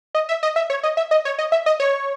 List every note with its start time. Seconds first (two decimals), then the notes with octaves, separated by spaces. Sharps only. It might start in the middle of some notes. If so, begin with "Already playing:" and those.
0.15 D#5
0.29 E5
0.43 D#5
0.56 E5
0.70 C#5
0.83 D#5
0.97 E5
1.11 D#5
1.25 C#5
1.39 D#5
1.52 E5
1.66 D#5
1.80 C#5